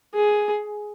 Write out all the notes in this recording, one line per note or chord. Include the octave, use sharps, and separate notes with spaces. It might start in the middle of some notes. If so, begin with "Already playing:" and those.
G#4